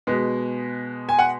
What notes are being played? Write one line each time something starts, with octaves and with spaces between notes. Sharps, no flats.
B2 G#3 B3
G#5
F#5